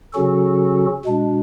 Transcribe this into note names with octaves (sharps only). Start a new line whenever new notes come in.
C#3 F#3 C#4 F#4 A4
B2 G#3 D4